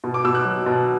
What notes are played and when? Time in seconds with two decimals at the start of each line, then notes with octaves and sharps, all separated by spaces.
0.04 B2
0.14 D6
0.24 B2 E6
0.35 F#6
0.45 F#3
0.66 B2